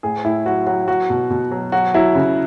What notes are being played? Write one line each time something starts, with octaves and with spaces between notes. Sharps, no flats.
A2 G#4
A2 E4
F#3 F#4
F#3 F#4
F#3 F#4
B2
B2
F#3
F#3 F#4
F#3 E4
C#3